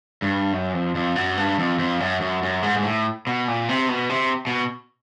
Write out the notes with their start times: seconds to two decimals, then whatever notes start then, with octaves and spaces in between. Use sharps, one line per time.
0.22 G2
0.53 F#2
0.74 F2
0.95 F2
1.16 F#2
1.37 G2
1.59 F2
1.79 F2
2.00 F#2
2.21 F#2
2.43 F#2
2.63 G#2
2.77 G#2
2.84 A2
3.27 B2
3.48 A#2
3.69 C3
3.89 B2
4.09 C3
4.47 B2